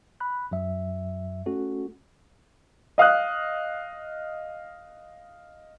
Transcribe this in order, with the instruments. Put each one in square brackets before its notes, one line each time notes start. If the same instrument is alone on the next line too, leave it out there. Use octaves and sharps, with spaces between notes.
[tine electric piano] B5 F#6
F#2 F#3 E5
A3 C#4 F#4 A4
[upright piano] D#5 F5 D#6 F#6